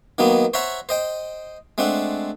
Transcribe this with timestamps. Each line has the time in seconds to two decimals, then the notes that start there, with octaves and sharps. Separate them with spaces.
0.18 D#3 F#3 A#3 B3 D#4
0.54 C5 C#5 E5 F#5 A#5 C#6
0.89 C5 D#5 G5
1.78 G#3 A3 C4 D4 F#5